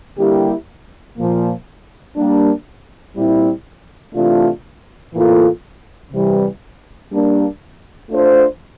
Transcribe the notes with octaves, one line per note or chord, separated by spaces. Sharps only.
D3 G3 A#3 E4 G4
A#2 F3 A#3
G3 A#3 D4
A#2 G3 C4 E4
C3 E3 A3 D4 F4
A2 E3 A#3 F4 A4
C3 E3 G3
G3 A#3 D4
A3 D4 F4 C5